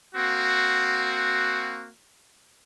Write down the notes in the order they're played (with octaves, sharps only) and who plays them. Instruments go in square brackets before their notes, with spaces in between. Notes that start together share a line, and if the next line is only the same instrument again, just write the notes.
[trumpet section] A#3 C4 F#4